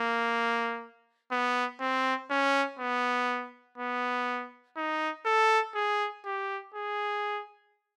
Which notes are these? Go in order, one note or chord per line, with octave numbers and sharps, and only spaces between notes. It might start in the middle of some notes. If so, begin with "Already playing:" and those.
Already playing: A#3
B3
C4
C#4
B3
B3
D#4
A4
G#4
G4
G#4